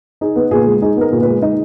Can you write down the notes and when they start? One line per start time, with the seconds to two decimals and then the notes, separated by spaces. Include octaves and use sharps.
0.21 D#4 G#4
0.36 B3
0.51 A#2 G#4
0.67 G#3
0.82 D#4 G#4
0.97 B3 A#4
1.12 A#2
1.22 B4
1.28 G#3
1.42 D#4 D#5